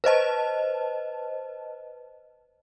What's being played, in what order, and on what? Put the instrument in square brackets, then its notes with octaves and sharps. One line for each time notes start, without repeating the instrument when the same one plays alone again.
[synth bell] B4 C5 D#5 A5